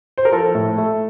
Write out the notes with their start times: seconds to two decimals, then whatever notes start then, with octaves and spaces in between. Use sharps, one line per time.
0.18 C5
0.25 A#4
0.32 F3 A4
0.55 A2
0.78 A3